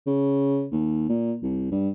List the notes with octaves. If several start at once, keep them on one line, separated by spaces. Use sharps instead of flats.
C#3
D#2
A#2
C2
G2